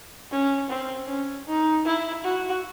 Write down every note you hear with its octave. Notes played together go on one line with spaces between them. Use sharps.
C#4
C4
C#4
D#4
E4
F#4